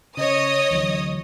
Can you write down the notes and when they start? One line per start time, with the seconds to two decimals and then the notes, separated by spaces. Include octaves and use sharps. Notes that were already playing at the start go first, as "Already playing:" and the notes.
0.17 C#3 C#5 D#5 D#6
0.71 D2 E3 F#3